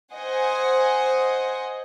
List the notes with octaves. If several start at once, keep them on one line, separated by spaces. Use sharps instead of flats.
C5 D#5 F#5 G#5